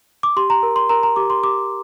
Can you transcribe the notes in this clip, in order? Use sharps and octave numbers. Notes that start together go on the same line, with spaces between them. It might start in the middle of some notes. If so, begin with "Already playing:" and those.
D6
G4 C6
A#5
A#4
C6
A#4 A#5
A#5
G4 D6
C6
G4 D6